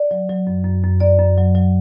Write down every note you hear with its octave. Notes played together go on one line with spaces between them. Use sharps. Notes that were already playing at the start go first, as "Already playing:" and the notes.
Already playing: D5
F#3
F#3
F#2
F#2
F#2
F#2 D5
F#2
F#3
F#3